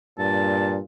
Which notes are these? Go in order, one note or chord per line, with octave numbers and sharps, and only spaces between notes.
G2 A#2 A5